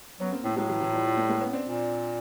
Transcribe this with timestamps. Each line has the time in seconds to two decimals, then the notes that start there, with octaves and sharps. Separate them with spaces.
0.20 F#3 B3 C#4
0.33 A#3 C4
0.44 A2 A3
0.56 A2 F#3 G#3
0.68 E3 F#3
0.81 E3 F#3
0.93 F3 G3
1.05 F3 G3
1.17 G3 A3
1.29 G#3 A#3
1.41 B3 C#4
1.53 C4 D4
1.66 A#2